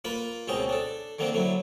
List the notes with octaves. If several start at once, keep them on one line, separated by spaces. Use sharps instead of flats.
A#3 F4 B4 B5
C#2 B2 C4 C#4 D#5 G5
D4 A4
D3 D#3 A#3 C4 D4
D3 F#3 E4